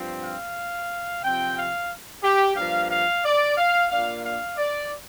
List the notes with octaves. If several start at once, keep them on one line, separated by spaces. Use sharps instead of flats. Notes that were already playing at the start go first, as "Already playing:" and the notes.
Already playing: G2 F3 C4
F5
C3 F3 C4 G5
F5
G4
G2 F3 A#3 F5
F5
D5
F5
A#2 A#3 D4 F5
F5
D5